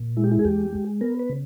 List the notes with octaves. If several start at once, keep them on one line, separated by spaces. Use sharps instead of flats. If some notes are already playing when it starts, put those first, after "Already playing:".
Already playing: A#2
G#3 E4
G4
E4
G#4
E2 G4
G#3
B3 A#4
B4
C#3